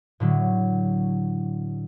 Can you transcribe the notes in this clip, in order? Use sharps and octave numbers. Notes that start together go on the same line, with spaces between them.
A2 D3 F#3